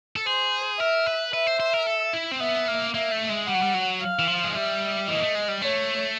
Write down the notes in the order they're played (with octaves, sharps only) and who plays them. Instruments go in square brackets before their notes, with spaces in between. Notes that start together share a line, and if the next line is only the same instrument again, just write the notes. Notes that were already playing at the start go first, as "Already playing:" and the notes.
[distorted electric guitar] A4
[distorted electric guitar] G#4 [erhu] C5
[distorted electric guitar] A#4 [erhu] E5
[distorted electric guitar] B4
[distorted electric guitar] B4 [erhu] E5
[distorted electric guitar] C5
C5
A#4
A4
E4
C4
[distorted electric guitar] B3 [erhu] E5
[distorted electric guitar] A#3
[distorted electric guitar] A#3 [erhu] E5
[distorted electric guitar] A3
G#3
[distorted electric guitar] G3 [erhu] F#5
[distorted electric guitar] F#3
G3
F#3
[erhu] F5
[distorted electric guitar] E3
F3
G#3
[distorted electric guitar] G3 [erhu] E5
[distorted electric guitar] E3 [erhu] D#5
[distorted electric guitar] A#3
A3
G#3
G3
[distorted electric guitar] A3 [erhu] C#5